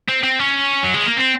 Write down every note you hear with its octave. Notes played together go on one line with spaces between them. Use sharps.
C4
C4
C#4
F#3
G#3
A#3
C4